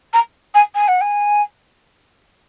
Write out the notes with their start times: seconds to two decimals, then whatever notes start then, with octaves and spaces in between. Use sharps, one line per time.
0.13 A#5
0.54 G#5
0.74 G#5
0.88 F#5
1.01 G#5